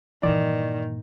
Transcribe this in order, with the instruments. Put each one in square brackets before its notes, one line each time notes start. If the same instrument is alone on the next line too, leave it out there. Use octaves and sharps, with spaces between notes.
[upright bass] G2 A#2 [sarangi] D#3 [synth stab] E3 [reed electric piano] D5